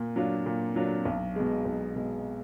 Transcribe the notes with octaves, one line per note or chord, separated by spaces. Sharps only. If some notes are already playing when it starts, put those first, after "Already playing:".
Already playing: A#2
F#3 D4 F4
A#2
F#3 D4 F4
B1
B2 G#3
B1
B2 G#3